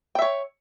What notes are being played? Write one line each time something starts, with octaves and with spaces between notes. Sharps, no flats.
C#5 E5 G5